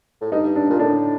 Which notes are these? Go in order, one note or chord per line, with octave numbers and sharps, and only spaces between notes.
A2
G2 D#4
D4
A#2
A2 D4